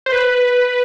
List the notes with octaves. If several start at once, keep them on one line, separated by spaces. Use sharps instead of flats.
C5
B4